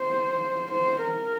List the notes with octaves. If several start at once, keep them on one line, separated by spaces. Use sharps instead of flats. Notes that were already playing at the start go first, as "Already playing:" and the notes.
Already playing: C5
C5
A#4